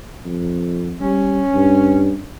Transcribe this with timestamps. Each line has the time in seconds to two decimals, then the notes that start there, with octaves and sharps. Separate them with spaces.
0.25 F2
1.01 G3 C#4
1.53 G2